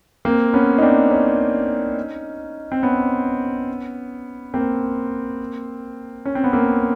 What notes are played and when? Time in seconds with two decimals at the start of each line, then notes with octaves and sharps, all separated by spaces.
0.25 A#3 C4
0.53 B3 C#4
0.78 D#4
0.82 C4 D4
1.11 C#4 D#4
2.72 C4
2.83 B3 C#4
4.54 A#3 C4
6.25 C#4
6.35 C4
6.44 B3
6.53 A#3 C4